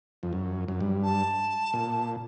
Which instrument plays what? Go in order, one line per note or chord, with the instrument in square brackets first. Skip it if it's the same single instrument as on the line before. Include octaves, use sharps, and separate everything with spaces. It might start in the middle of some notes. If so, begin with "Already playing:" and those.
[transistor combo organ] F2
F#2
F#2
G2
[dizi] A5
[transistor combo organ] A#2